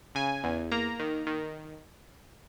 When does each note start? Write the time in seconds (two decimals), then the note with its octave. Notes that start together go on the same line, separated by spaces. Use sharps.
0.15 C#3 G#5
0.44 E2
0.72 A#3 A#5
1.00 D#3
1.27 D#3